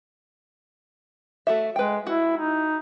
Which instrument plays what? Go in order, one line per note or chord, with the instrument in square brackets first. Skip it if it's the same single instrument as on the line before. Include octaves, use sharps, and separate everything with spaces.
[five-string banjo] A3 F#4 E5
[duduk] G#3 [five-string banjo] B4 G5
[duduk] E4 [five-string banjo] F#4
[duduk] D#4